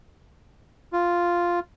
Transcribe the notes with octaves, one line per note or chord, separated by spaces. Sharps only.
F4